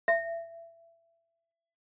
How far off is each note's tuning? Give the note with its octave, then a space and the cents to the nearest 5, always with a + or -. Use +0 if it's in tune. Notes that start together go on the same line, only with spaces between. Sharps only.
E5 +25